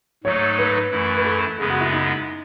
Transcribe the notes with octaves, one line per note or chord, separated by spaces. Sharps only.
G#2 F#3 A3 D#4 A4 C#5
B4
F#2 E3 A3 E4
B4
A4
F#2 C#3 G#3 B3 G#4
F#4
E4
D#4